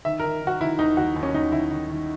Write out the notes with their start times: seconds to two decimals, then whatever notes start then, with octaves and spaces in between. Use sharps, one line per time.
0.05 D#3 E5
0.20 D#3 A#4
0.42 D#3
0.47 F#4
0.61 D#3 E4
0.79 D#2 D#4
0.97 D#2 F#4
1.16 D#2
1.23 C#4
1.34 D#2 D#4
1.52 D#3 E4
1.71 D#3
1.90 D#3